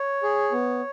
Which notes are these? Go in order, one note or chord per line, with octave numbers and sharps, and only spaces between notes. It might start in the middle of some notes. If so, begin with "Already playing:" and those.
Already playing: C#5
G#4
B3